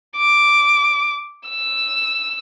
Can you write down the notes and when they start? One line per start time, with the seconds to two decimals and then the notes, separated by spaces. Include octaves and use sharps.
0.17 D6
1.49 E6